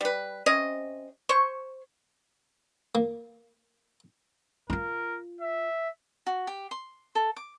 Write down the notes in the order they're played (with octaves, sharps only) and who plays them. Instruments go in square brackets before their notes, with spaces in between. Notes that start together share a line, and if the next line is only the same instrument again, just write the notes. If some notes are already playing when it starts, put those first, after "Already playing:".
[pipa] G3 B4
C3 C#4 D#5
C5 C#5 C#6
[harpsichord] A#3
[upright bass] E4 F4 [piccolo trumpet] A#4
[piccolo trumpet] E5
[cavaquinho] F#4
G4
C6
A4
D6